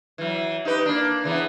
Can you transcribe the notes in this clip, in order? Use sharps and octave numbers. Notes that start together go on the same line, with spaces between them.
E3 F#3
D#4 G4 B4
A#3 D4
C#3 E3 B3